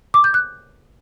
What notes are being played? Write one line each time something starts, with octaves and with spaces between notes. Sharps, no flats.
D6
G6
F#6